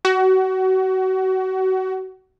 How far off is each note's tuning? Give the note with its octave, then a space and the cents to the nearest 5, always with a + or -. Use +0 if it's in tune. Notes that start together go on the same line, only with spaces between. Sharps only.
F#4 +30